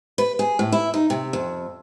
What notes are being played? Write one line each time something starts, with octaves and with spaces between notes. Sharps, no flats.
B4
G#4
A2
E4
D#4
C3
F2